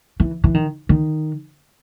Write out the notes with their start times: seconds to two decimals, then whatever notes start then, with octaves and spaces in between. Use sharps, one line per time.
0.20 E3
0.44 E3
0.54 D#3
0.89 D#3